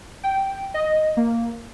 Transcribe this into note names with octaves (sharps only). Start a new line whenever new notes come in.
G5
D#5
A#3